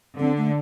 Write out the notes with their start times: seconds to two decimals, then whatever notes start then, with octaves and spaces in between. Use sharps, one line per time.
0.20 D3 C4
0.37 A3